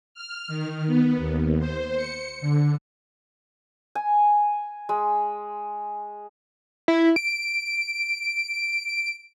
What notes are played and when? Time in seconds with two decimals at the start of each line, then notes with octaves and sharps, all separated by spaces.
0.14 F6
0.48 D#3
0.87 B3
1.17 D#2
1.59 C5
1.96 C#7
2.41 D3
3.95 G#5
4.89 G#3
6.88 E4
7.16 D7